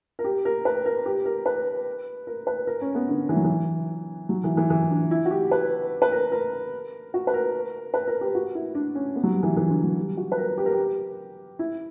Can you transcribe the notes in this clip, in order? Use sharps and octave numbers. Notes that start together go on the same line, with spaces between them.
A#4
G4
A#4
B4
A#4
G4
A#4
B4
A#4
B4
A#4
C#4
B3
D3
E3
F#3
E3
F#3
E3
E3
E3
D4
E4
F#4
G4
B4
B4
A#4
A#4
F#4
B4
A#4
B4
A#4
G4
F#4
E4
D4
C#4
B3
F#3
G3
E3
E3
D3
F#3
G3
F#4
B4
A#4
G4
A#4
G4
E4